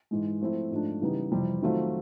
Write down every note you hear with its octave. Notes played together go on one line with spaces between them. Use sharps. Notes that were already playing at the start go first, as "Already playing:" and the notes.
G#2 E3 G#3
F3 A3 C4 E4
G#2 F3 A3 D4
C#3 E3 G3 B3 D#4
F2 C3 E3 G3 C4
D#3 F#3 A3 C4 F4